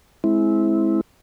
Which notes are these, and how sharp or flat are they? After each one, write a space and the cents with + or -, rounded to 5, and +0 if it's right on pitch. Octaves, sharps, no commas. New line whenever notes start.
G#3 +15 C4 +0 E4 -15